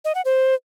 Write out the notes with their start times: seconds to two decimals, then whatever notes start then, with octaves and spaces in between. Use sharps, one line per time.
0.05 D#5
0.15 F#5
0.25 C5